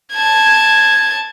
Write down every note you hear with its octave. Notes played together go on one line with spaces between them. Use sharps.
A5 G#6